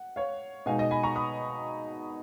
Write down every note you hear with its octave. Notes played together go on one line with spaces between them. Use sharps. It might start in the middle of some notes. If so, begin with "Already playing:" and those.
Already playing: F#5
C#5 F5
B2 G#3 D#4 F5 G#5
D#5
G#5 B5
A#5 C#6
B5 D#6